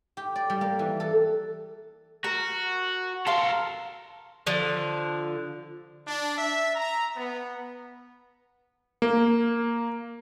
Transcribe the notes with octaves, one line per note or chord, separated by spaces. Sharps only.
G4
D5
G3
A#3
E3
A4
F#4 A#4
A4 A#4 F5 C6
D3 F3
D4
E5
A#5
B3
A#3